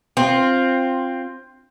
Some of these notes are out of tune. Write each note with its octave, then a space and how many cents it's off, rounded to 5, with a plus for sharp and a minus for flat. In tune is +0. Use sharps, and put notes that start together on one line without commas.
C4 +10 F4 +0